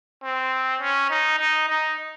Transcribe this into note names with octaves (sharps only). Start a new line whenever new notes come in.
C4
C#4
D#4
D#4
D#4